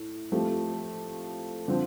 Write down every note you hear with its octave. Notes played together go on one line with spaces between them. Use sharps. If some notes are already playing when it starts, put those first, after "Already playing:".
Already playing: A2
F3 A3 C4 G4
D3 F3 C4